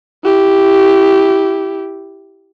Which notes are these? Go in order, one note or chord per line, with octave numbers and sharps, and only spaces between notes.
E4 G4